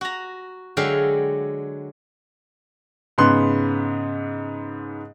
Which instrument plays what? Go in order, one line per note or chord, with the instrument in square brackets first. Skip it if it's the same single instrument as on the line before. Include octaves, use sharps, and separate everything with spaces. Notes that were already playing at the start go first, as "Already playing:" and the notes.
[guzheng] F#4 A#5
D3 F#3 G#3 E5 F5 G5
[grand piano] G#2 C#3 B3 C6 F#6